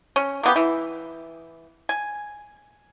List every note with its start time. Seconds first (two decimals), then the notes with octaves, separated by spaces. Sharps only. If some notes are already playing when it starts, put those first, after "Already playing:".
0.16 C#4
0.43 A#3 B3 G4
0.56 E3
1.89 G#5